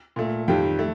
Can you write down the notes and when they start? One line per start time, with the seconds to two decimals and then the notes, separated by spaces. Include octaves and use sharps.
0.16 A#2 A3
0.48 F2 D#3 G3 G5
0.79 A3